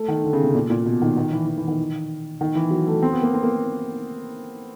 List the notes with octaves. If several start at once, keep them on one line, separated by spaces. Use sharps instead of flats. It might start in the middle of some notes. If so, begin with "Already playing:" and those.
Already playing: A3
D#3
D3
C#3
C3
A#2
A#2
B2
D#3
D#3
E3
E3
E3
D#3
D#3
E3
F#3
A3
C4
B3
A#3
C4
A#3